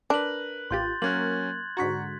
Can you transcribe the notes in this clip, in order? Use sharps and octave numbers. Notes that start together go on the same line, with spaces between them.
D4 A#4 B4 F#6 F#7
A1 F4 G4 C6 G6 A6
F#3 A#3 C#4 A#4 F#6 G#6 F#7
G#2 D3 F#4 A#5 C#6 B6